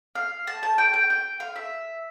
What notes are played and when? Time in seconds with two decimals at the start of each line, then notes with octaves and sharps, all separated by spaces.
0.15 F5
0.47 A5
0.63 A5
0.78 G5
0.94 G5
1.10 G5
1.40 F5
1.56 E5